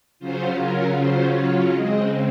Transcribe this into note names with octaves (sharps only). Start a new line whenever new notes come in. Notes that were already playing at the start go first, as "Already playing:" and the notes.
C#3 F#3 C#4 F4 C5
A#4
C5
C#5
C#3 G#3 C4 D#5